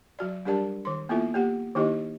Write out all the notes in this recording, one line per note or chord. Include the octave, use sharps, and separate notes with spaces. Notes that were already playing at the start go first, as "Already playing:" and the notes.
F#3 F#4 D5
G3 D4 G4 A#4 D5 A5
D#3 C6
A#3 B3 E4 F4 A4 E5
A#3 G4 F#5
D#3 A#3 D#4 E4 G4 D#5